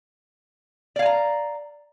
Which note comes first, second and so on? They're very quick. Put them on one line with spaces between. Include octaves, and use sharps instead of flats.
D5 F5 G#5 A#5